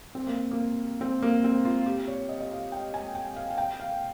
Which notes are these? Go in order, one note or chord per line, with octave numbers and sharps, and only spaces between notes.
C4
A#3
A#3
C4
A#3
C4
F4
G4
C#5
D#5
D#5
F5
G5
G#5
G5
F5
F5
G5
F5